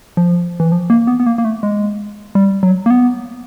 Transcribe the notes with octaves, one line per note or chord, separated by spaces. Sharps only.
F3
E3
F3
A#3
B3
B3
A#3
A#3
A3
G#3
G3
F#3
A#3
B3